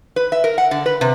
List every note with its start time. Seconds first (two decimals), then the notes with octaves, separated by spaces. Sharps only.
0.16 B4
0.32 E5
0.44 A#4
0.58 F#5
0.71 D3
0.86 B4
1.01 C3